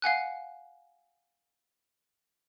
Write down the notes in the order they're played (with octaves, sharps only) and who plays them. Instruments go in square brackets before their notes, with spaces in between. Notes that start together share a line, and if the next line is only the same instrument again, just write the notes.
[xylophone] F5 F#5 G#5 F#6